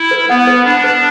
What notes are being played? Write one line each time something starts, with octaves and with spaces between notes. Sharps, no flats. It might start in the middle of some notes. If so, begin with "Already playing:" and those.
Already playing: E4
B4
B3 F#5
B4
D4 B5
B4